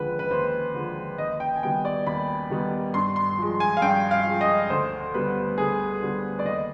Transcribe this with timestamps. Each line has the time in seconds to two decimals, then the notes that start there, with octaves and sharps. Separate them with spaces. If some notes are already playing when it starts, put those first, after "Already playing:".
Already playing: D#2 D3 F3 G#3 B4
0.19 B4
0.31 D#2 C5
0.75 D3 F3 G#3
1.18 D#2 D#5
1.40 G5
1.56 G#5
1.63 D#3 G3 B3 G5
1.85 D5
2.07 D#2 B5
2.50 D#3 G3 B3
2.94 G2 C6
3.16 C6
3.38 F3 G#3
3.60 G#5
3.77 F5
3.82 G2 G5
4.11 F5
4.26 F3 G#3
4.41 D#5
4.70 D2 C5
5.14 D3 G3 B3 B4
5.58 D2 G#4
6.02 D3 G3 B3
6.39 D5
6.45 D#2 D#5